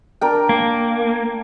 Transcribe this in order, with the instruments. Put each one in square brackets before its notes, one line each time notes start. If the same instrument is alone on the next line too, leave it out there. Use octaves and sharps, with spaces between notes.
[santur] D4 A#4 G5
[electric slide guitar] A#3